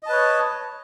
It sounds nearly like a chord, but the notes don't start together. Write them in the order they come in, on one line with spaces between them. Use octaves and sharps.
D#5 A5 B4 C#5